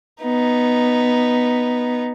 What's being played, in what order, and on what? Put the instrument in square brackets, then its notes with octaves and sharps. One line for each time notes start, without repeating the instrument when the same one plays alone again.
[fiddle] B3 D#4